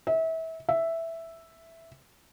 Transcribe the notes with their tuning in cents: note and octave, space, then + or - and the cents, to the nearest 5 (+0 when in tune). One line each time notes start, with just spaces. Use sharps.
E5 -30
E5 +0